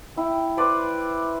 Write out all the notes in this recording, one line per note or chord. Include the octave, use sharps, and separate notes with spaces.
E4 G5
B4 C5 D5 B5